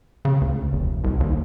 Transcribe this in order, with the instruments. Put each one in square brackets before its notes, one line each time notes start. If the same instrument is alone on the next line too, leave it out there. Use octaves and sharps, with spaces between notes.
[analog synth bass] C#3
D2
F1
C2
D#2